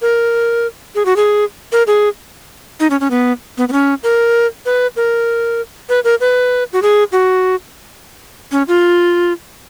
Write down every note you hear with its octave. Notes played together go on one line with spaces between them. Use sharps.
A#4
G#4
F#4
G#4
A#4
G#4
D#4
C#4
C#4
B3
B3
B3
C#4
A#4
B4
A#4
B4
A#4
B4
F#4
G#4
F#4
C#4
F4